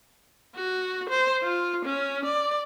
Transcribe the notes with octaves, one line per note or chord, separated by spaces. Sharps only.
F#4
C5
F4
C#4
D5